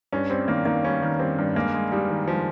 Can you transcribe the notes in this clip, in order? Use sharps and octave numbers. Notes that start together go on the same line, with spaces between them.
G2 C#4
G3 C4
D#3 A#3
D#3 A#3
G3 C#4
D#3
G3 C4
G2
G#3 A#3
G#3
G3 D#4
D#3
F3 G#3